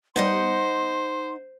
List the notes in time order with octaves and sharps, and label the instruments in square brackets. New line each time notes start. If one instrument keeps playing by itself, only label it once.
[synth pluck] G3 B3 [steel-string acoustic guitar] D#4 D#5 F#5 [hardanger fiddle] C5 [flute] C6